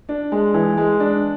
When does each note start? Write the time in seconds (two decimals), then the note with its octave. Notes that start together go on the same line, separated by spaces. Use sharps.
0.09 D4
0.32 G#3
0.54 E3
0.77 G#3
1.00 D4